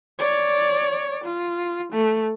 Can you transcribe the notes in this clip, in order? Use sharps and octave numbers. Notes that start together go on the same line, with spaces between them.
C#5 D5
F4
A3